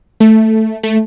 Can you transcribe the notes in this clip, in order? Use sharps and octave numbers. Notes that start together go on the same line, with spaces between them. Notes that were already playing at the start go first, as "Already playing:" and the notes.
A3
A3